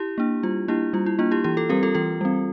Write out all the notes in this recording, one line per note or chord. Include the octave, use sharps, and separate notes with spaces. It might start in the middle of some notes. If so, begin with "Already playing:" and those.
Already playing: E4 G4
A#3 D4
G3 F4
A#3 D4 E4 G4
G3 F4
E4
A#3 D4 F4
E4 G4
E3 E4 G4
F4 A4
G3 C4 G4 A#4
F4 A4
E3 F4 A4
G3 C4